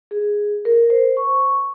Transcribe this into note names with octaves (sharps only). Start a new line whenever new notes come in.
G#4
A#4
C5
C#6